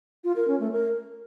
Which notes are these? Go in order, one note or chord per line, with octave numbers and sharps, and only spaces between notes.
F4
A#4
C#4
A3
A#4